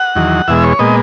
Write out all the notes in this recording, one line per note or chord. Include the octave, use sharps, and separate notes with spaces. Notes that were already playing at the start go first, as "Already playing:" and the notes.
Already playing: F#5
E2 D#3 F#3
E2 B2 G#3 E5
C#5
A#2 G#3 B3 D#5